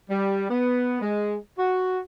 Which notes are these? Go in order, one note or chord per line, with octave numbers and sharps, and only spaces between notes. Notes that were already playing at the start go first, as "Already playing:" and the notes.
G3
B3
G#3
F#4